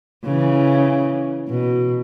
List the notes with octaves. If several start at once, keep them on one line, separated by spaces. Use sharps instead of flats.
C#3 E3
B2